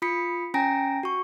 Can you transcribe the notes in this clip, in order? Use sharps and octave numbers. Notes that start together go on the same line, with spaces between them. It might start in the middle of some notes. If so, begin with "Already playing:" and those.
F4 B5 D#6 B6 C#7
C#4 G5 G#5 A#5 A#6 D7
F#4 C#6